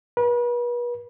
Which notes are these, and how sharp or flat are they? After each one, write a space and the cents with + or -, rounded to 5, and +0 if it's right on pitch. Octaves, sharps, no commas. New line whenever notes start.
B4 -40